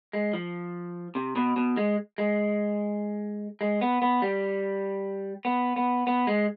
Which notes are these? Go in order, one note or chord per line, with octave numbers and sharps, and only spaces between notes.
G#3
F3
C3
B2
B2
G#3
G#3
G#3
B3
B3
G3
B3
B3
B3
G#3